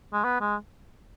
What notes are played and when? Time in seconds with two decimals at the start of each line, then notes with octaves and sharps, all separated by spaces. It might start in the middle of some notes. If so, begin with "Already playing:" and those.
0.13 G#3
0.24 B3
0.41 G#3